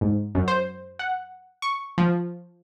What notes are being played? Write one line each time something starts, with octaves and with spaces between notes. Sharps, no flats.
G#2
F#2
C5
F#5
C#6
F3